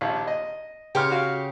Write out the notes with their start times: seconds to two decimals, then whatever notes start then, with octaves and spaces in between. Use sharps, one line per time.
0.01 A#1 D#2
0.27 D#5
0.95 C#3 G4 C#5 G5 C6 F6
1.11 F#4 F5